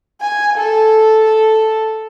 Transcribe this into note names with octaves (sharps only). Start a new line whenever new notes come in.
G#5
A4
A4